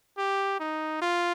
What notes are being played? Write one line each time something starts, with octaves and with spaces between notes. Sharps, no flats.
G4
D#4
F4